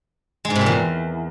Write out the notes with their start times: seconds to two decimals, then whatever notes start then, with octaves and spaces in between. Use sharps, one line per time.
0.45 G#3
0.50 G#2
0.55 C3
0.61 A#2
0.66 E2